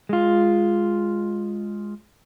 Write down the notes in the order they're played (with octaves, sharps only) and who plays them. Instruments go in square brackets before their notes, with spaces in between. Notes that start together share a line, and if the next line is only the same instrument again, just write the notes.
[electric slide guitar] G#3 F4